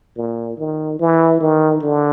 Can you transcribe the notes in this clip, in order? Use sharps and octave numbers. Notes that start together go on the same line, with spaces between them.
A#2
D#3
E3
D#3
D3